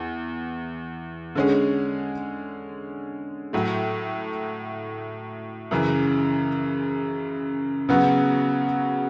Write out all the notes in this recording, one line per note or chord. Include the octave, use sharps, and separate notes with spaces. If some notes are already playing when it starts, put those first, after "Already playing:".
Already playing: E2
D3 G#3 C#4 G#4
A2 F#3 A3
F#2 C#3 E3
C#3 F#3 B3 F#4